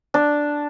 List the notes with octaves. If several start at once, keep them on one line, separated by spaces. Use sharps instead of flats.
D4